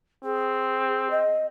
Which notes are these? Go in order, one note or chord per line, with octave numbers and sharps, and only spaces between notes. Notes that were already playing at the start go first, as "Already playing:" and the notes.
C4 G#4
D#5